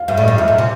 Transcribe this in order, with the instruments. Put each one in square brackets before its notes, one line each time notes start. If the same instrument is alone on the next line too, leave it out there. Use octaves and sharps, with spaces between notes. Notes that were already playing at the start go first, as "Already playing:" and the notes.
Already playing: [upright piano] F5
[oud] G2 [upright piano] E5
[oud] A2
[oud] G2 [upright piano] D#5
[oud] F2 [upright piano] E5
[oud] F#2
C3